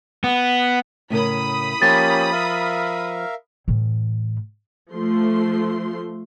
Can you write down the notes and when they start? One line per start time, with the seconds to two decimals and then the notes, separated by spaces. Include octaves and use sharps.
0.24 B3
1.10 A2 C#3 A#4 B5 D#6 B6
1.82 F3 A#3 C#4 G4 C5 A6
2.32 A#4 E5 F5
3.68 A2 E3
4.93 F3 A3 C6